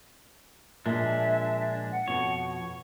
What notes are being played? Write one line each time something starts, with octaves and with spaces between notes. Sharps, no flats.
A#2 F3 G#3 D4 E5
F#5
F2 B2 C#5